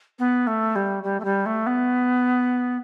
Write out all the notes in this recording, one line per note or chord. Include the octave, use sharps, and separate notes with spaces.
B3
A3
G3
G3
A3
G3
A3
B3